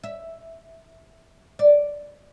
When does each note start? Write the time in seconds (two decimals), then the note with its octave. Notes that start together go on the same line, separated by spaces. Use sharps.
0.04 E5
1.59 D5